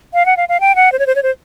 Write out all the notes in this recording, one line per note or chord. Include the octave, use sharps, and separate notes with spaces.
F5
F#5
F5
F5
G5
F#5
C5
C#5
C5
C#5
C5